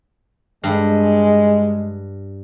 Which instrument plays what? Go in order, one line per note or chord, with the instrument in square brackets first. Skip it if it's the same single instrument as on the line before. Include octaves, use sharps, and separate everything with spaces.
[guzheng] G2 [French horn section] G#3